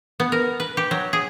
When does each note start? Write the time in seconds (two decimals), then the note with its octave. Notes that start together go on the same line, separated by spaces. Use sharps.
0.20 B3
0.32 A#4
0.60 B4
0.77 G4
0.91 F#3
1.13 G#4